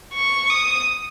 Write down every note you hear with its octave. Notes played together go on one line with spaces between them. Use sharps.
C#6
D#6